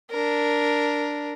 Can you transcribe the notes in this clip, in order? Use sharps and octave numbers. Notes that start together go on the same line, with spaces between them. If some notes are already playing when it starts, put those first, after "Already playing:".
D4 A#4